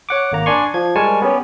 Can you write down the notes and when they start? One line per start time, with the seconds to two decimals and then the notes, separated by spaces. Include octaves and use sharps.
0.09 C#5 F#5 D6
0.32 G#1 A#3 A#5
0.46 D4 D5 G#5 C6 C#6
0.74 F3 G#6
0.96 G3 G#3 A#4 G#5 A5 C#6
1.22 B3 C#4 G4